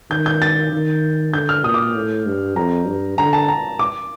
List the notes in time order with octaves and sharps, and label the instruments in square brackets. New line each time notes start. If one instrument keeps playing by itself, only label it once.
[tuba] D#3 [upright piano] G6
[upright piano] G6
A6
[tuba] D#3
[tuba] D3 [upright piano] G6
[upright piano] F6
[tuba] A#2 [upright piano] D#6
[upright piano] D6
[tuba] A2
G2
[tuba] F2 [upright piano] A#5
[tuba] G2
[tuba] D3 [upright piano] A#5
[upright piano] A5
A#5
D6